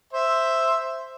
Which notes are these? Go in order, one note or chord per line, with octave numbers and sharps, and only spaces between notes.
C5 E5